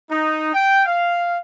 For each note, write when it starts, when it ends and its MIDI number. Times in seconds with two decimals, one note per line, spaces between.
0.10 0.50 63
0.53 0.82 79
0.86 1.37 77